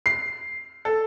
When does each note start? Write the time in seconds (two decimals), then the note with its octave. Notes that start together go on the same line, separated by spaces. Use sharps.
0.06 C7
0.85 A4